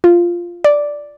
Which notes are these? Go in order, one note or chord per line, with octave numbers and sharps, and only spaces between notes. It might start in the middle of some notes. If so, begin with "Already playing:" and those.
F4
D5